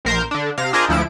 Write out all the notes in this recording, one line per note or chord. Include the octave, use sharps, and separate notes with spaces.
A#1 A#4 C5 G6
D3 D4
C3 F5 A#6
D4 F4 G#4 A#4 C5 D#5
D2 F3 E4 D7